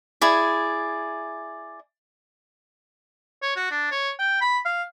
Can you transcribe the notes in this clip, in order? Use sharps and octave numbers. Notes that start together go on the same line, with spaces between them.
E4 G#4 D5
C#5
F#4
D4
C#5
G5
B5
F5